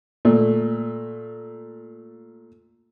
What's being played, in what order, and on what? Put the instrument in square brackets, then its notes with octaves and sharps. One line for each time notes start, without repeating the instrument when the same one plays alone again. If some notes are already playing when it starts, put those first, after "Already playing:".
[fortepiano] A#2 A3